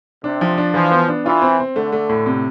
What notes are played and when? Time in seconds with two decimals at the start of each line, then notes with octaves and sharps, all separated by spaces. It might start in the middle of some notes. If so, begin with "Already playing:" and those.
0.24 C3 D4
0.41 F3
0.58 D4
0.74 E3 F3
0.91 B3
1.08 D4
1.25 E3 F4
1.42 C4
1.60 C4
1.76 D3 A3
1.92 A3
2.09 A2
2.26 C3